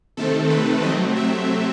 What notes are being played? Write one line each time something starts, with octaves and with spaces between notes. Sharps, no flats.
C3 D#3 A3 C4 A4
B4
C3 F#3 A3 C4 D#5
E5